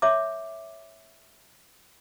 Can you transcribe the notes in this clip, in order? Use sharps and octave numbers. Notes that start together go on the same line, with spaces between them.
C#5 E5 D6